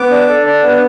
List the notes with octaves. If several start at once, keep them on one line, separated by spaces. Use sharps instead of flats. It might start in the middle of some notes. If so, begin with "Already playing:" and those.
Already playing: B3 D6
D4
A4
D4
B3